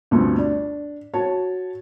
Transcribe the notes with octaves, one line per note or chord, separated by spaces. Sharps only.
D2 G2 B2 F3 A3 C4
D4
F#4 C#5 A5